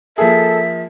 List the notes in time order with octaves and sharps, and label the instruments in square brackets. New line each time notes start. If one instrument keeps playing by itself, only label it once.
[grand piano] F3 A#3 G#4 [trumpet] A4 [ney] E5